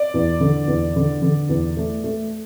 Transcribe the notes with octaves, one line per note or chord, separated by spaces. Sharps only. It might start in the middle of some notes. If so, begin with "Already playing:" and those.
Already playing: D5
E2
D3
E2
D3
D3
E2
A3
A3